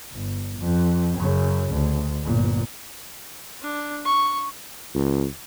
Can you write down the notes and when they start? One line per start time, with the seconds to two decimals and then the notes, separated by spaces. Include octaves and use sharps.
0.12 G1
0.59 F2
1.19 F#2 C#3
1.73 D2
2.23 G1 A#2
3.61 D4
4.05 C#6
4.95 C#2